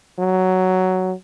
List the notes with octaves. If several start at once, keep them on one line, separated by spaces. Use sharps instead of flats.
F#3